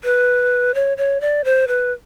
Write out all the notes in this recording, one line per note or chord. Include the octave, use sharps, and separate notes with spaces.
B4
C#5
C#5
D5
C5
B4